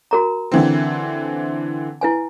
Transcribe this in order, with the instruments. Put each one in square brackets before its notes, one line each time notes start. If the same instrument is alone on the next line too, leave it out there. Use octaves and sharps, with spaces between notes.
[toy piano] F#4 A#4 A#5
[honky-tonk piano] D3 E3 C4
[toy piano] E4 B4 G#5